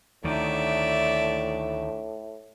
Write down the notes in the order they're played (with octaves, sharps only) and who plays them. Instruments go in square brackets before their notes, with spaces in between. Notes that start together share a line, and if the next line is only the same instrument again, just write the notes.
[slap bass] D2 D#3 [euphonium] A2 [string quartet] D5 E5